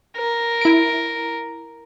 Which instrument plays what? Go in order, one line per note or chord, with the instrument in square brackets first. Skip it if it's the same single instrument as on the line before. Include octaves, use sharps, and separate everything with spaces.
[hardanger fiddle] A#4
[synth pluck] E4 D7